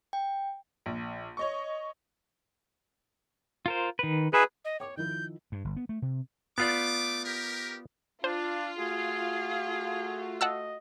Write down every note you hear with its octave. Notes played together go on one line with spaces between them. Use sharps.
G5
A#1
C#5 D#5 C#6
F4 A#4 C5
D#3 B4
D#4 F#4 G#4 B4 E5
D#5
C#5 G5 D6
D#3 F3 E4 G6
G2
G1
B3
A3
C3
A3 B3 F4 D5 D6
G4 A#4
D4 F4 C5
A3 F#4 G#4
D#5 F#5 A5 E6